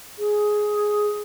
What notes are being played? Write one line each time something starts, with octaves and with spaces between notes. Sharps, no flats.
G#4